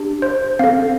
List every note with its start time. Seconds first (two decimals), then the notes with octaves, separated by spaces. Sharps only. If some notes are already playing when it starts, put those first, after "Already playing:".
Already playing: D4 G4
0.22 C5
0.59 C4 F5
0.64 A4